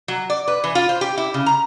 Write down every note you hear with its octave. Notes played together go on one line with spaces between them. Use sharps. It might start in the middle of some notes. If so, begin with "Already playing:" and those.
F#3
D5
B4
E3
F4
C5
G4
E4
C#3
A#5